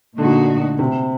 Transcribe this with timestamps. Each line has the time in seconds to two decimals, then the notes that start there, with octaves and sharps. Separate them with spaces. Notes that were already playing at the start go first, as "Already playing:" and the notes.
0.17 A#2 D3 A3 D#4 F#4
0.79 C3